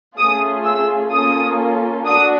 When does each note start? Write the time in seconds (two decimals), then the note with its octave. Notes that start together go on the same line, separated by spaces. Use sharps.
0.17 A3 C#4 F4 G#4 D#6
0.64 E6
1.12 A#3 C#4 F4 A4 D#6
2.07 D4 F#4 D#6